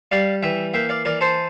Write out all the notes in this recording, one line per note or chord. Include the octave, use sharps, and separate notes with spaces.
G3 D5 F5
E3 E5 G5
A#3 E5 G5
D5 F5
E3 A#4 D5
A4 C5